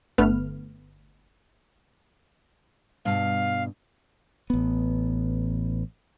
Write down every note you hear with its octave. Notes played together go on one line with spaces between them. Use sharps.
G1 D3 A3 B3 B4 F6
G2 B2 F5
A1 B3